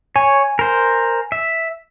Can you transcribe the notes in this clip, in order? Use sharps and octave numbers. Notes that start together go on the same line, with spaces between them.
C#5 G#5
A#4 C5
E5